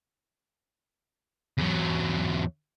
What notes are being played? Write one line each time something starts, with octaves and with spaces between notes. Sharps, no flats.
E2 F#3